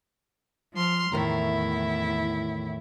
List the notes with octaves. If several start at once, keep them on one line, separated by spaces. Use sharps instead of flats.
F3 C6 F6
E2 A2 D#3 E4 A#5